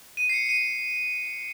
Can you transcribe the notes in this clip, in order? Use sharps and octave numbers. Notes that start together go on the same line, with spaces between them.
D#7
C7
C#7
D#7